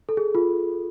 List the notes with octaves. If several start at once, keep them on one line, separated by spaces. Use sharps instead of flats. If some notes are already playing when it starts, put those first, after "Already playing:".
A4
G#4
F4